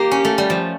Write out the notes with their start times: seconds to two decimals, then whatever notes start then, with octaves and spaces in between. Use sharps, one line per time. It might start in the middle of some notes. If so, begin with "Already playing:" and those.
Already playing: A#3 G4
0.11 C#4
0.25 A3
0.38 G3
0.50 F3